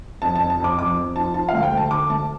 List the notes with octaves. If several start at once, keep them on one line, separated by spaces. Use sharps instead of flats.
F2 A5
F2 A5
A5
F2 D6
F2 D6
F2
F3 A5
F3 A5
D2 F5
G5
D2
A5
D3 D6
D2 A5